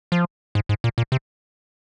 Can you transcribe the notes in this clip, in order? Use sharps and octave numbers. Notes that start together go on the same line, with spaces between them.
F3
G#2
G#2
A#2
A#2
C3